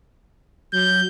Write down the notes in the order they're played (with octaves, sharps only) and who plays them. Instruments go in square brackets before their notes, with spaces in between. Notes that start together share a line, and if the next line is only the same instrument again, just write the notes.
[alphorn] F#3 [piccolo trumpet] G6